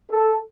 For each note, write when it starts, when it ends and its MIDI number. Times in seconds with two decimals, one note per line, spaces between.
0.10 0.34 69